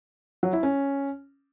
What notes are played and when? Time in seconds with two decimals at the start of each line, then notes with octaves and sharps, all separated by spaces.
0.43 F#3
0.53 E4
0.63 C#4